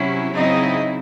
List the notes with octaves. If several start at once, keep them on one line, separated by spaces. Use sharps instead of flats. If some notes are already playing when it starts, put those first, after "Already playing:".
Already playing: C3 F#3 C#4 E4
C#3 F#3 C4 D#4 E4 D#5